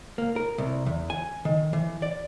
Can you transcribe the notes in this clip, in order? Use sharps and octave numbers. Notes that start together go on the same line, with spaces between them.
A#3
A#4
C2
E2
G#5
D#3
E3
D5